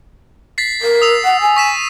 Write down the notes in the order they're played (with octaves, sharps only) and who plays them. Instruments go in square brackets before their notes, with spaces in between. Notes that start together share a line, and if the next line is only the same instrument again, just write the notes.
[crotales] A6 B6 C7
[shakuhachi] A#4
[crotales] D#6 E6 F7
[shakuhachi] F#5
G#5
[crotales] C#6 B6 E7